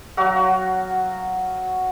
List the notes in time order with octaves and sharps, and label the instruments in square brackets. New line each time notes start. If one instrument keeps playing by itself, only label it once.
[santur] F#3 F#4 F5